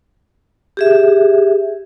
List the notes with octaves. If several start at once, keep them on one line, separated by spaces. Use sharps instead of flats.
G4 G#4 E5